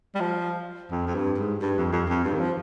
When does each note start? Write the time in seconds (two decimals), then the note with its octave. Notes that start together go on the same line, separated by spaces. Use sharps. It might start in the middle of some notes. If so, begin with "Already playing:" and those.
0.15 G3
0.20 F3
0.91 F2
1.07 F2
1.15 G2
1.38 G#2
1.62 G2
1.78 F2
1.92 F2
2.09 F2
2.25 G2
2.34 D#3
2.40 F3